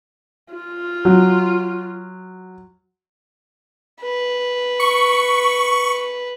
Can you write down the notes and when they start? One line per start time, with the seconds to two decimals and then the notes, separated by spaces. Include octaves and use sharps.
0.54 F4
1.05 F#3
4.02 B4
4.80 C#6